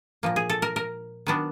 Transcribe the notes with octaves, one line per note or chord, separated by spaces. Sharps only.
A#2 F3 A#3
G#4
A4
A#4
A#4
D#3 F#3 B3 D4